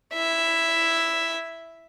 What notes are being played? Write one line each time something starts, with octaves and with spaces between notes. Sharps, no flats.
E4 E5